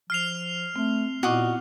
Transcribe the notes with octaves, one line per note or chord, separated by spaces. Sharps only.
F3 F6 C7 F7
A3 C4
A#2 B3 E4 F#4 D#5 D6